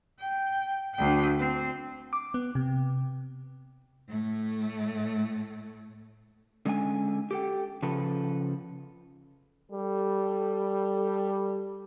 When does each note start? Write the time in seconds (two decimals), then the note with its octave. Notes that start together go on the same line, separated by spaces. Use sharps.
0.19 G5
0.95 D2 G5
1.39 C4
2.13 D6
2.34 B3
2.55 C3
4.08 A2 A3
6.66 D3 G#3 C#4 F#5 G#5
7.31 G4 A4 G5
7.83 C#3 F3 A4 B4
9.71 G3 A4